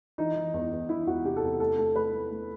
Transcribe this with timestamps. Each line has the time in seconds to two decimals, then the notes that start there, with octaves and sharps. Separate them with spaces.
0.18 E3 D#4
0.36 E3
0.54 E2
0.72 E2
0.89 E3 E4
1.07 E2 F#4
1.25 C3 G4
1.36 A4
1.42 E2
1.60 A3 A4
1.78 A3 A4
1.95 A3 B4
2.13 A3
2.31 A3